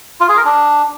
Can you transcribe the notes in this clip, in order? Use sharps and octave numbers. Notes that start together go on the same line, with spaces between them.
F4
G#4
A#4
D4